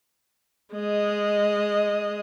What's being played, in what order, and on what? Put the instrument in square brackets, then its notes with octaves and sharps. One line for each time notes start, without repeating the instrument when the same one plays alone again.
[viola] G#3 D#5